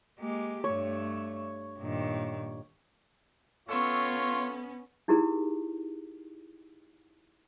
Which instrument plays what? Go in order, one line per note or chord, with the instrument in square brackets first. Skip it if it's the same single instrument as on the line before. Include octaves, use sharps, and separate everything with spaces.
[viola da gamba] G#3 A#3 G4
[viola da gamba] G2 A3 [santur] C#5
[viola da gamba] G2 A#2 D#3
[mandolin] A3 E5 C#6 [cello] B3 C#4 [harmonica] F4 C#5
[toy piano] D#4 E4 G4 G#4 A#4